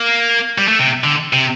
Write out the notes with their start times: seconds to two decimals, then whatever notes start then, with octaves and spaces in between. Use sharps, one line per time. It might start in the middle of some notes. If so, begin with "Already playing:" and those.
Already playing: A#3
0.58 G3
0.68 A3
0.79 C3
1.04 D3
1.33 C3